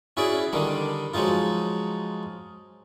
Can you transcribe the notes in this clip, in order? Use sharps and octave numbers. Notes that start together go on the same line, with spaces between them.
C#4 E4 F#4 G#4 D5
D3 D#3 G3 D4
F3 F#3 G#3 D#4 F4